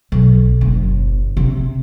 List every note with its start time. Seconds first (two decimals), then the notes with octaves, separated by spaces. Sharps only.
0.12 B1
0.61 F#1
1.37 C3